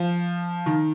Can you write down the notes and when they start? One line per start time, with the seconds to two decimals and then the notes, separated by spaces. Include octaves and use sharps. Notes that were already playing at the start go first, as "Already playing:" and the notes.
Already playing: F3
0.66 D#3